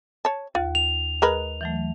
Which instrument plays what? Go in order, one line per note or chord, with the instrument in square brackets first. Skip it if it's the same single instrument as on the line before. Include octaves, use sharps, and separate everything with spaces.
[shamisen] C#5 A5
[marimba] D#2 [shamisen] F4
[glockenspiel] F7
[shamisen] G#3 A#4 B4
[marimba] E3 F#3 A3